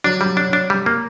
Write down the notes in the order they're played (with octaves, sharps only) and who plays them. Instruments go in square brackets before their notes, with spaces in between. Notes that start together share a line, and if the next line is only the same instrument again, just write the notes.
[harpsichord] F#3 [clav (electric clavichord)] D4
[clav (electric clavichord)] G3
D4
D4
G3
A#3